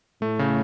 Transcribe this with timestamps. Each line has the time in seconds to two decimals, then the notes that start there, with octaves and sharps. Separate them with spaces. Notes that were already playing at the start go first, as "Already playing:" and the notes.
0.22 A2 A3
0.39 C#3